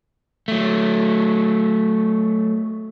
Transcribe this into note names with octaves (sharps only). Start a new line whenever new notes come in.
F#3 A3